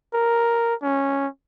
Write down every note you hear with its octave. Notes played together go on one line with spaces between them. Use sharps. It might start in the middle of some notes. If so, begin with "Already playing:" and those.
A#4
C#4